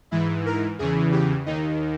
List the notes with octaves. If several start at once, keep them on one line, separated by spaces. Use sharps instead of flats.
G#2 E3 E4
A#4
E2 C#3 E3 G#4
G4
D#2 D#3 D#4